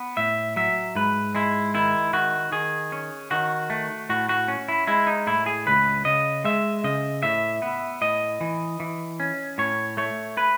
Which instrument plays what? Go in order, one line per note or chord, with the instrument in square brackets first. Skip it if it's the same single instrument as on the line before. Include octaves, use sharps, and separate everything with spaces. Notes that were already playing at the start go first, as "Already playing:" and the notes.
Already playing: [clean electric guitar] B3
A2 E5
F#3 E5
G#2 B4
G#3 E4
D#3 E4
D#3 F#4
D#3 G#4
C#4
D#3 F#4
A3
A2 F#4
F#4
C#4
E4
G#3 E4
D#4
A2 E4
G#4
C#2 B4
C#3 D#5
G#3 E5
C#3 D#5
A2 E5
B3
A2 D#5
E3
E3
C#4
A2 C#5
A3 C#5
B4